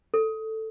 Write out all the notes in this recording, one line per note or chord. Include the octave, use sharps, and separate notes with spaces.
A4